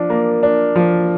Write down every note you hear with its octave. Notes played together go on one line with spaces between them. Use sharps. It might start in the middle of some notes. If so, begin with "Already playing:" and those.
Already playing: F3 D4
A#3
D4
F3